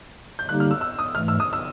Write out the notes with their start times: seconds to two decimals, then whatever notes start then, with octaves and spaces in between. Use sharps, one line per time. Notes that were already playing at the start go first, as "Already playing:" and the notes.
0.39 G6
0.49 D3 G3 A#3 D#4 G4 F#6
0.60 F6
0.71 E6
0.81 E6
0.99 D#6
1.15 G#2 E3 A3 F6
1.28 E6
1.40 D#6
1.53 E6